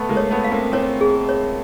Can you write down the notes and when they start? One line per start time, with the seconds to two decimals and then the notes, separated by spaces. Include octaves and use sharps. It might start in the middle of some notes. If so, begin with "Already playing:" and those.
Already playing: A3 B3
0.09 G#3 A#3
0.17 C#5
0.31 A3 B3
0.44 F5
0.52 A#3 C4
0.72 A#3 C4 C#5
1.01 G#4
1.29 C#5